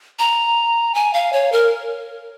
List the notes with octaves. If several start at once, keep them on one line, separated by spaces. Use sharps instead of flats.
A#5
G#5
F5
C#5
A#4